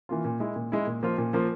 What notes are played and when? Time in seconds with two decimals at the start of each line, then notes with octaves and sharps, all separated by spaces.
0.09 E3 A#3 F4
0.24 A#2
0.40 G#3 E4
0.56 A#2
0.72 G#3 E4
0.87 A#2
1.03 F3 A#3 F4
1.18 A#2
1.33 F3 A#3 F4